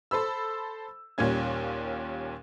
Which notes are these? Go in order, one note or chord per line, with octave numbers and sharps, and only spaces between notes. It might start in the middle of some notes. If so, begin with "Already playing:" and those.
A4 C5 B5 E6
D#2 A#2 G3 C#4 G#6